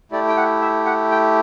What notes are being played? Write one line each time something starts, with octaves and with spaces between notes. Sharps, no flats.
A3 E4 G4 D5
G5
F#5
E5
F#5
G5